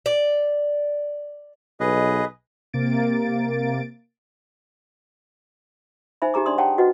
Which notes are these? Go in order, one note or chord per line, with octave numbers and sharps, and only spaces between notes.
D5
B1 G#4 B4 D#5
C3 A#3 A6 D7
D#4 C5 E5 G#5 B5
D#4 G4 G#4 A#5 D6
D4 D5 C6 D#6
C#5 F#5 G5 A5 A#5
F#4 B4 D#5 F#5